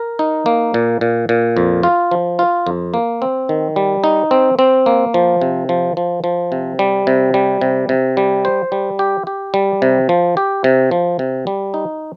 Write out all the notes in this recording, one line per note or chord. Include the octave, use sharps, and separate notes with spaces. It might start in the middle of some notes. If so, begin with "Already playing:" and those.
Already playing: A#4
D#4
A#3
A#2
A#2
A#2
F2
F4
F3
F4
F2
A#3
C4
D#3
G3
D#4
C4
C4
A#3
F3
C3
F3
F3
F3
C3
G3
C3
G3
C3
C3
G3
C5
G3
G4
G4
G3
C3
F3
G4
C3
F3
C3
G3
D#4